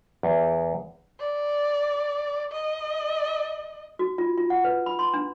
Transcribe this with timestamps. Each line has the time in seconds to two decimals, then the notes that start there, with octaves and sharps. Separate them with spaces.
0.23 E2
1.19 D5
2.52 D#5
3.99 F#4
4.18 F4
4.37 F4
4.50 F#5
4.64 B4
4.86 B5
4.99 C6
5.13 D4